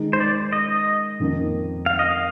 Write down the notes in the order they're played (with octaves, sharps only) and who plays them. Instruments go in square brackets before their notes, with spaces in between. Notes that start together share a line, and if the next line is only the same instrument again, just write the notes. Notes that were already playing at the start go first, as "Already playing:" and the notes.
Already playing: [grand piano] D#3 G#3 D#4 G#4
[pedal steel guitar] C5
D5
D#5
[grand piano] F2 D#3 A#3
[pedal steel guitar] F5
D#5
F5